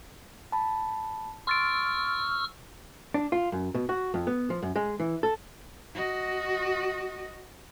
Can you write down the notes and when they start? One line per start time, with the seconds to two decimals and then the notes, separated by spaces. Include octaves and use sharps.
0.52 A5 B5
1.47 C6 C#6 E6 F6 A6 D7
3.14 D4
3.32 F4
3.52 F#2
3.74 B2
3.89 F#4
4.14 F2
4.27 B3
4.50 F3
4.62 F#2
4.76 G#3
5.00 E3
5.23 A4
5.95 F#4 D#5